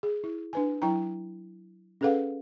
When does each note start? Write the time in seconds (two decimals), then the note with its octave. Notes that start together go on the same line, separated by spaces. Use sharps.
0.03 G#4
0.24 E4
0.53 D4 B4 G#5
0.82 F#3 E4 G5 A#5
2.01 C#4 G#4 A4 B4 F5 F#5